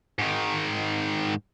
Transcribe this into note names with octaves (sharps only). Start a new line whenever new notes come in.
G#2 D#3